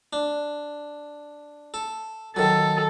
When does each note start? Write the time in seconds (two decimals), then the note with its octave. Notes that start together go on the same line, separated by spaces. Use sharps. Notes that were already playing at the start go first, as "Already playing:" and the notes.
0.13 D4
1.74 A4
2.36 D#3 F#3 A4